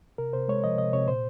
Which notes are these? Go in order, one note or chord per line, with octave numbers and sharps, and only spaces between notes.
C3 A#4
C3 C5
G#3 C#5
F3 D#5
C3 D#5
C3 C#5
A#2 C5